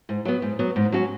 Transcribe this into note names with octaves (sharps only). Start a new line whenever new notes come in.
G#2
F#3 B3
G#2
F#3 B3
G#2
F#3 C#4 F#4